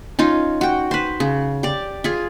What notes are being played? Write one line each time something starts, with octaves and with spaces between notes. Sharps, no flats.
C#4 D#4 F4
F#4 G5
B4 C5
C#3
G4 D5
F4 G#4